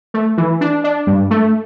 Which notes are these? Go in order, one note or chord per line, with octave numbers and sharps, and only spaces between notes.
A3
E3
D4
D4
G2
A3